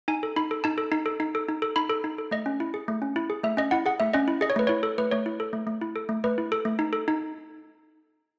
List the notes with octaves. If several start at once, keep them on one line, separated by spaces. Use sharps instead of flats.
D#4 G#5
A4
D#4 B5
A4
D#4 A5
A4
D#4
A4
D#4
A4
D#4
A4
D#4 B5
A4
D#4
A4
A3 D#5
C#4
E4
G#4
A3
C#4
E4
G#4
A3 E5
C#4 D#5
E4 F#5
G#4 F#5
A3 E5
C#4 D#5
E4
G#4 D#5
C#5
A3 B4
E4 C#5
A4
A3 B4
A3 C#5
E4
A4
A3
A3
E4
A4
A3
A3 B4
E4
A4
A3
D#4
A4
D#4